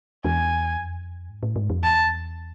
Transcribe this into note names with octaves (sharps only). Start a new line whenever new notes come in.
E2 G#5
F2
G#2
A2
G#2
F2
E2 A5